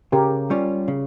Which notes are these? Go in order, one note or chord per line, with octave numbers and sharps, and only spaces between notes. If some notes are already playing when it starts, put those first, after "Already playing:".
C#3 G4 A#4
G3 C#4 F4
C#3